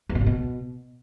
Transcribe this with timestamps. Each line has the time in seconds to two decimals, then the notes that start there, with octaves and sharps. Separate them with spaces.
0.09 E2
0.15 B2
0.21 A#2
0.26 B2